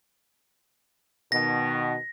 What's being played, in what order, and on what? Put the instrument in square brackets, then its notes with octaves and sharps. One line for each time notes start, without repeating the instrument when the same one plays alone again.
[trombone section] B2 D#3 [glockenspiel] A#6